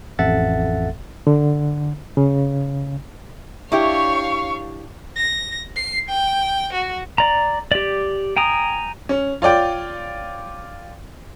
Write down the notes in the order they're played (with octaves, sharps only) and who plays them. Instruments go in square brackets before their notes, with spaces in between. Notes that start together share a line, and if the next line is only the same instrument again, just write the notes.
[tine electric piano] A1 F2 A4 E5 F#5 A6
[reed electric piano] D3
C#3
[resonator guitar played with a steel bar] D4 E4 G4 [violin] C#5 F5 [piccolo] C#6
[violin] A#6
C7
G5
F#4
[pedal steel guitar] D5 A#5
G4 D5
G5 G#5 A#5 D#6
[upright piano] C#4
F4 C#5 D5 G5